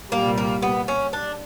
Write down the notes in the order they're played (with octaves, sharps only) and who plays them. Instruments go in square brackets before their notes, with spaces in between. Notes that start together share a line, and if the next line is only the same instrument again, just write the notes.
[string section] C2 A#2 G3 [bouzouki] A#3
[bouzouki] A#3
B3
C#4
D4